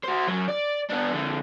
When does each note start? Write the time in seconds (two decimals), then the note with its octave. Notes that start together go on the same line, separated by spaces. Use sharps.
0.04 F#4 C5
0.28 F#2 F#3
0.48 D5
0.90 B3 D4
1.11 F2 D3